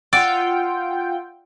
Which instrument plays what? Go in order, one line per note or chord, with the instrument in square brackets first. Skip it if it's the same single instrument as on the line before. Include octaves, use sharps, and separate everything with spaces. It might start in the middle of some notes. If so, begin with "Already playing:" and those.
[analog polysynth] F4 G5 [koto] D5 [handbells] F#5 E6